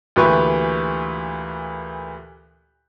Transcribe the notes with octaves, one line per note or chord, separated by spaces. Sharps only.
D2 A#2 E3 G4 B4 C#6